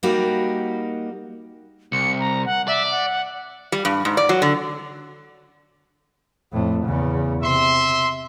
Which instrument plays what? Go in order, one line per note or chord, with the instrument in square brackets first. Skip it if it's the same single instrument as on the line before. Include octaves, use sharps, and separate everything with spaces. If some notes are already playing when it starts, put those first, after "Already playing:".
[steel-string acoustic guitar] G3 A#3 D#4 F#4 G4
[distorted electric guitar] C2 [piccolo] C#7
[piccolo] A#5
F#5
[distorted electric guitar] D5 [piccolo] E5
[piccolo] F#5
[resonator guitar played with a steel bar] G3
G2
G#2
D5
F#3
D3
[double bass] F2 A2
E2 C#3
[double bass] C3 [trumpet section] E5 C6